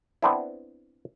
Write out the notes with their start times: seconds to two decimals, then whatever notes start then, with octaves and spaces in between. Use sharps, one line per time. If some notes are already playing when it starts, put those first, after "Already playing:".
0.22 B3 C4 D4 E4